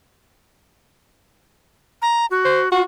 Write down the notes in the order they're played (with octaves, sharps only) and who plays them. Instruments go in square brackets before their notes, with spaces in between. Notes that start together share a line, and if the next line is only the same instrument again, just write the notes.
[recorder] A#5
F#4
[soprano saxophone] C5
[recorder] F4 [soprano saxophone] F#4